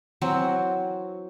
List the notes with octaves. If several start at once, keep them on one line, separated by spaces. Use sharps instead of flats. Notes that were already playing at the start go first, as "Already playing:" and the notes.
E3 F#3 C4 F#4